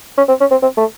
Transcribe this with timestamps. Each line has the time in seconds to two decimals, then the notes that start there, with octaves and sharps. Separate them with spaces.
0.17 C#4
0.28 C4
0.40 C#4
0.51 C4
0.62 C4
0.77 A3